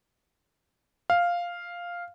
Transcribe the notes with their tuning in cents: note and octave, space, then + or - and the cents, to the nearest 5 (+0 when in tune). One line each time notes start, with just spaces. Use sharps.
F5 +0